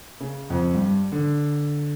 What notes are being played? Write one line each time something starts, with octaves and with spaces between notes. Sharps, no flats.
C#3
F2
G2
D3